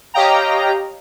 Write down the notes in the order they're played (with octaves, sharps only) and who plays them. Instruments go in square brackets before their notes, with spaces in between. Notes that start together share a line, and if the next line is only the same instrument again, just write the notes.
[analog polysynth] G4 C#5 D#5 F5 G5 A#5